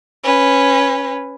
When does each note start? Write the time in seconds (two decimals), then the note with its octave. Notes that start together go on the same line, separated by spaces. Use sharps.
0.24 C#4 B4